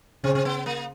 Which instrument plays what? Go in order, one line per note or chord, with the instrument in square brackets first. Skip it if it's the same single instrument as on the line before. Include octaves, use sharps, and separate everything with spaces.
[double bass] C#3 [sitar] C4
[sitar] C4
B3
A#3